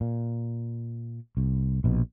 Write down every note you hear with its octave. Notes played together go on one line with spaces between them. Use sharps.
A#2
C2
A#1 B2